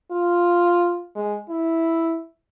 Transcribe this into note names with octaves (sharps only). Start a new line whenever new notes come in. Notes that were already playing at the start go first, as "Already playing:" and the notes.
F4
G#3
E4